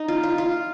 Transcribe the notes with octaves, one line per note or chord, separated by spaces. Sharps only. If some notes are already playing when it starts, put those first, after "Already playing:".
Already playing: D#4
F4
F4
F4